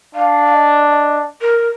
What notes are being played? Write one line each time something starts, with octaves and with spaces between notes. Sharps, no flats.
D4 F5
F5
D#5
D#5
A#4